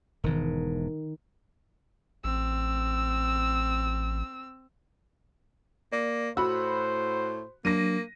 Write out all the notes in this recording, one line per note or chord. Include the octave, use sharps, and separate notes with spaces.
E1 G#2 D#3
A1 C4 E6
A#3 D5
A2 F#4 C5 B5 E6
F#3 A#3 D4 A#6 D#7